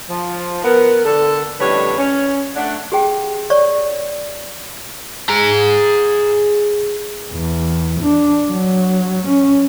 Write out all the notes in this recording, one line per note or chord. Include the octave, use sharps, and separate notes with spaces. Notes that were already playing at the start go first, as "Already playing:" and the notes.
F3
B3 A#4
D3 A4
F2 A2 D3 G3 B4 C#5
C#4
A3 D4 F#5
G4 G#4 G5
C#5 D5 C#6
G#4 A#5
E2
D4
F#3
C#4